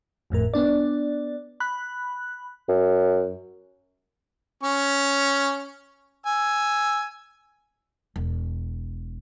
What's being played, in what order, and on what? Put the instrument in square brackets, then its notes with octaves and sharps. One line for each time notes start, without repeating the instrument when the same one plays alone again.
[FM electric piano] G1 F2 A2 A#4
B3 D4 D5
B5 F#6
[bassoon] F#2
[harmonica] C#4 C#6
G#5 E6
[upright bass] E1